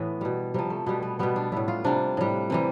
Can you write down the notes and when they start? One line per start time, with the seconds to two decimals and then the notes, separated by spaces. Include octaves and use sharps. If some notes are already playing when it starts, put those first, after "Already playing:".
Already playing: A2 E3 B3
0.21 B2 G3
0.54 C3 F3 G3
0.70 A3
0.86 B2 G3 B3
1.03 B3
1.19 B2 G3 B3
1.36 D4
1.52 A2 G3 E4
1.68 F4
1.84 C3 G3 D4
2.17 A2 G3
2.50 C3 E3 G3